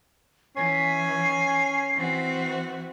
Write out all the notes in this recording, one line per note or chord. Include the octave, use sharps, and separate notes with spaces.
E3 C#4 G#5 C7
E3 C4 F#4